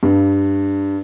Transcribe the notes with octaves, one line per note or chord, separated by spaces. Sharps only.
G2